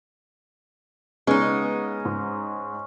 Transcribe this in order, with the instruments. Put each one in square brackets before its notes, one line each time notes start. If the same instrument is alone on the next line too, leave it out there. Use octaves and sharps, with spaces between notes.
[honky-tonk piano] C#3 B3 [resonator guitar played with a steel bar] G#3 D#4 [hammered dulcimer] C#4
[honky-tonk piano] G#2